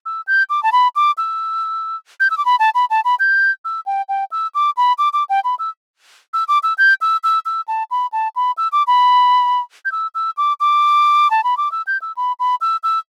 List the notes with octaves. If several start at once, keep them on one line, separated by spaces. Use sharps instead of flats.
E6
G6
D6
A5
B5
D6
E6
G6
E6
D6
B5
A5
B5
A5
B5
G6
E6
G5
G5
E6
D6
B5
D6
D6
G5
B5
E6
E6
D6
E6
G6
E6
E6
E6
A5
B5
A5
B5
E6
D6
B5
G6
E6
E6
D6
D6
A5
B5
D6
E6
G6
E6
B5
B5
E6
E6